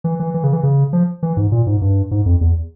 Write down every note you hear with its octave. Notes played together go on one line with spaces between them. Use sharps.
E3
E3
E3
C#3
E3
C#3
F3
E3
G#2
A#2
G#2
G2
G#2
F2
E2